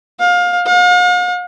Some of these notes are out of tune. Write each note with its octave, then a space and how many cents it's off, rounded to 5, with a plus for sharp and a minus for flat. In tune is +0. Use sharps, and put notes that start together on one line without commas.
F5 +25
F5 +45